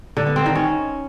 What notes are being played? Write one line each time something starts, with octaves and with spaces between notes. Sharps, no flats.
D3
B3
C4
D#3
C#4